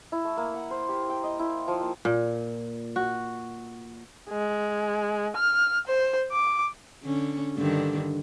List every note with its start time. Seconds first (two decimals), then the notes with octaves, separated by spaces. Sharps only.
0.12 E4
0.25 A3
0.37 A#3
0.54 F#5
0.71 C5
0.89 G4
1.10 G5
1.24 D#5
1.39 E4
1.68 F3
1.81 A#3
2.05 A#2
2.96 F#4
4.30 G#3
5.36 F6
5.87 C5
6.32 D6
7.03 D3 C#4
7.56 G2 D3 D#3